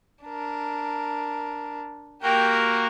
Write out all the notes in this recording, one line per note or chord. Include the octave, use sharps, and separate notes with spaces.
D4 A#4
A#3 F#4 G4 A#4 G5